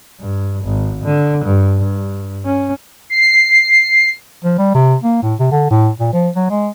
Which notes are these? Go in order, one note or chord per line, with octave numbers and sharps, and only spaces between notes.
G2
G#1
D3
G2
G2
C#4
C7
F3
G3
C3
A#3
A2
C3
D3
A2
A#2
F3
F#3
G#3